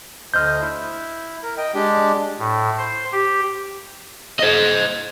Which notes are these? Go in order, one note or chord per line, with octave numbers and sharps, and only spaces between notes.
D2 C5 D#5 F6 G6
E4
A#4
D#5 G5
G#3 D4 G4
A2
C5
G4
C5 D#5